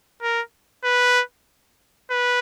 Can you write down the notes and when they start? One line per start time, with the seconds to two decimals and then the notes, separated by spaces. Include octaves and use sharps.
0.22 A#4
0.84 B4
2.10 B4